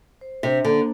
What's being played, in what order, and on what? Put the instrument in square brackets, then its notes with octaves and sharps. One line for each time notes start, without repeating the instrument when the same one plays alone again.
[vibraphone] C5
[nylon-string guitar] C3 [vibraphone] D4
[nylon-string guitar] D3 [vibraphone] A#3